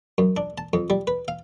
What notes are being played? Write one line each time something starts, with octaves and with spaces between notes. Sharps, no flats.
F#2
D4
A5
F2
G3
B4
F5